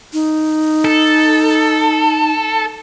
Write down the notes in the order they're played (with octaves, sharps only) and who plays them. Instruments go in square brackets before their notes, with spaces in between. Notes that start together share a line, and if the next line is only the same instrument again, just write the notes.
[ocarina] D#4
[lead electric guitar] A4